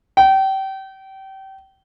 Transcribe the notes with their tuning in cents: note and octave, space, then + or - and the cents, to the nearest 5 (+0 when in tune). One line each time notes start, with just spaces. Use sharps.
G5 -30